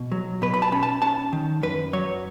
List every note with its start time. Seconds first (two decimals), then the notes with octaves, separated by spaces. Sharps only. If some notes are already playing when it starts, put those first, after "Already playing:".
Already playing: B2
0.12 F#3
0.42 B2 B4
0.54 B5
0.62 A5
0.72 C#4 B5
0.83 A5
1.02 C#4 A5
1.33 D#3
1.63 F#2 B4
1.93 F#3 C#5